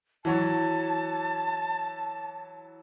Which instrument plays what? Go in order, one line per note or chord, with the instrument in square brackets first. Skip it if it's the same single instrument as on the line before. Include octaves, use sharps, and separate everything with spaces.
[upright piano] E3 F#3 C#5 [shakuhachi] A5